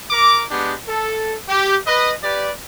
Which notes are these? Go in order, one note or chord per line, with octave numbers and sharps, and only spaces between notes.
A#4 A#5 D6
G#3 B3 D4 G4 G5
A4
G4
B4 D#5
G4 B4 D5